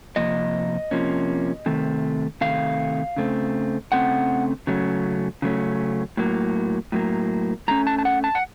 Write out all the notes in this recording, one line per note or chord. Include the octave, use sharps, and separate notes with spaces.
C3 F3 A#3 D#5
C3 F3 A#3 C#4
C3 D#3 A3
C3 D#3 A3 F5
C#3 A3 C4
C#3 A3 C4 F#5
C#3 F#3 A3 C#4
C#3 F#3 A3 C#4
A2 F#3 A#3
A2 F#3 A#3
A2 A3 C#4 A#5
A5
A5
F#5
A5
F#5